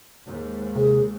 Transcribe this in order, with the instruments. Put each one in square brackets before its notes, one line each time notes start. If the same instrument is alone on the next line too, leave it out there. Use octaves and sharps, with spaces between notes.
[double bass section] D#2 G#2
[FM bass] C3 [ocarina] G#4